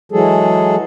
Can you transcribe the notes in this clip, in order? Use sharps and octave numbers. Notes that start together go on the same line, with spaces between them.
E3 F#3 G#3 G#4 A4